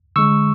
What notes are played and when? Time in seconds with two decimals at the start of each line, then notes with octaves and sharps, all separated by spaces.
0.16 D3 G#3 C#6 E6